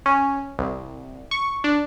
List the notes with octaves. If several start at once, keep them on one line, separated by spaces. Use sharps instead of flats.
C#4
C2
C#6
D4